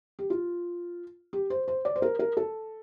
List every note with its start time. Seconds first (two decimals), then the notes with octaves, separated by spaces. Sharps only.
0.19 G4
0.30 F4
1.33 G4
1.50 C5
1.68 C5
1.85 D5
1.96 C5
2.02 A#4
2.19 A#4
2.37 A4